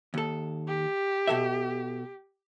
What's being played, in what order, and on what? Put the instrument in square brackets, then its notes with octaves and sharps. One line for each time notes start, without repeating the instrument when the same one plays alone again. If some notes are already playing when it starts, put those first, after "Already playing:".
[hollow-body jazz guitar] D#2 A4
[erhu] G4
[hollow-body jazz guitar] B2 A4 E5